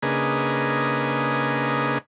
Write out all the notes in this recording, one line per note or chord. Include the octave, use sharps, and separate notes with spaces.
C#3 A#3 D4 G#4 B4 D#5